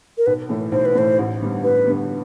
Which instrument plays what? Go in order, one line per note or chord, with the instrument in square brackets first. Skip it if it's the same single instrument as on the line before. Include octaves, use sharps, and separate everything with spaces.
[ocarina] A#4
[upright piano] B1 [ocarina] B4
[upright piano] A2 E3 A3
[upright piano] B1 [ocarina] C5
[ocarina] B4
[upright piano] A2 E3 A3 [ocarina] C5
[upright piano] A1
G2 D3 G3 B3
[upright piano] A1 [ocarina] B4
[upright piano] G2 D3 G3 B3